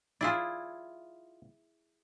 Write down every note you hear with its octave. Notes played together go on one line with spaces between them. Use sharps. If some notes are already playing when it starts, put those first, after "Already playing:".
E4 F4 G#4 D5 E5